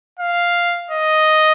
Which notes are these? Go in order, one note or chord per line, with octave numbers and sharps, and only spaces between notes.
F5
D#5